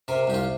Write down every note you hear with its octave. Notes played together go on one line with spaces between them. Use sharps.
C3 A#4
C2 G4
F4